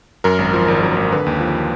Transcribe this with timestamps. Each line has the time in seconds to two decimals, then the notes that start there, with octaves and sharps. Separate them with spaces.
0.24 F#2 A#4
0.39 G#1
0.53 F3
0.68 G#1
0.82 F#2
0.97 G#1
1.12 D3 B4
1.26 D#2
1.40 F3